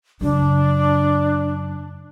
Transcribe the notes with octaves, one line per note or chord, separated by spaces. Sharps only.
F#2 C#3 D4